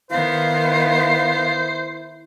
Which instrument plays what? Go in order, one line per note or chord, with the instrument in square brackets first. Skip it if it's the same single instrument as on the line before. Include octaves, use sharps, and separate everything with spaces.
[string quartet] D#3 B3 [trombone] E4 [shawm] C5 [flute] F5